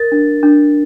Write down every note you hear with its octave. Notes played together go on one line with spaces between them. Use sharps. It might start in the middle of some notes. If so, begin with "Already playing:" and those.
Already playing: A#4 A6
D4
D4